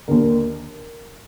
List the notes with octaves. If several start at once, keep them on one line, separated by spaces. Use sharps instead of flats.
D#2 D3 A#4